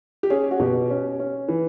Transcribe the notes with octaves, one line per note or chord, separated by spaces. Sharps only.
G4
C#4 G#4
F#4
B2 G4
C#4
C#4
E3